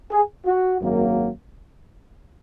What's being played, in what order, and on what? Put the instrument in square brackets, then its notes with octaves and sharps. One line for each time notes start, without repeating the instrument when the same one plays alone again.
[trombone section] G#4
F#4
G#1 F#2 F#3 A#3